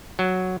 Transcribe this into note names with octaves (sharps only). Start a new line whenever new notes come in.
F#3